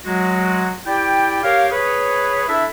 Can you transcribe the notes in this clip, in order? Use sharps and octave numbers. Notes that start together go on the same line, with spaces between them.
F#3 G#3 F#4
E4 G4 D5 G5
G4 A#4 C#5 F5
G#4 B4 C#5
D4 E4 A4 E5